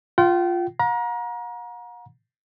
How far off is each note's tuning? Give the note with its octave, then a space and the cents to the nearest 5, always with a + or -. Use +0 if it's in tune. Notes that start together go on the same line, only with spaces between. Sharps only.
F4 +0 G5 -40
F#5 -45 A#5 +30